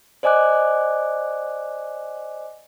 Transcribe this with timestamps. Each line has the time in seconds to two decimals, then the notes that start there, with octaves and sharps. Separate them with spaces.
0.23 C5 D5 D#5 G#5 D6 F#6